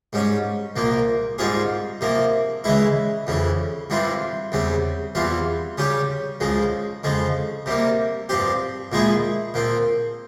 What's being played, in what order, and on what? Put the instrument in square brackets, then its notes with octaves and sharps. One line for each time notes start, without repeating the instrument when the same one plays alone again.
[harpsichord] G#2 G3 C#4
C2 A#2 F3 A#3
G#2 G3 C4 F4 G#4
C3 F3 A#3
C#3 E3 G#3 E4
F2 C#3 E3
G2 E3 G3 C4 F4
E2 C#3 G3 C4
E2 E3 G3 C4 F4
C#3 G3 C#4 G4
C#2 C#3 F3 G#3
F2 C#3 F3 G#3
C3 G3 A#3
G2 F3 C4 G4
A#2 F3 G#3 E4 G#4
A#2 F3 C4